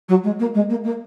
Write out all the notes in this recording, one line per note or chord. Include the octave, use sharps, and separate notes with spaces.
F#3
G#3
A#3
G#3
A#3
A#3